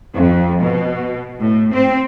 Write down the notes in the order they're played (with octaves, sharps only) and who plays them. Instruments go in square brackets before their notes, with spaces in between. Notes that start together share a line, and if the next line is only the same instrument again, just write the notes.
[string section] F2
B2
A2
C4